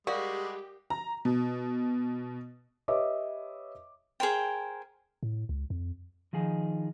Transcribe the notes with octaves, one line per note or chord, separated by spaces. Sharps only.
G3 G#3 F#4 G4 A#4 D5 F5 D#6
A#5
B2
G4 B4 C#5 D#5 E5 D6
G#4 A#4 C5 G5
A2
C#2
F2
D#3 F3 D#4 G#4